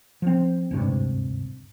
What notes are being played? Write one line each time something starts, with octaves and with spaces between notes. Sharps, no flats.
F3 C4
D1 G#1 G2 C3